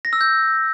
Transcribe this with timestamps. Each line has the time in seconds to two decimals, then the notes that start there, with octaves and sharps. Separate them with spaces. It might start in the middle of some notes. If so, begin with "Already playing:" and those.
0.05 A#6
0.13 E6
0.21 G6